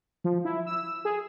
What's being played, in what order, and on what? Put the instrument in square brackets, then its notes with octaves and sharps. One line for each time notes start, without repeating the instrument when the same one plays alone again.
[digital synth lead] F3
E4
E6
G#4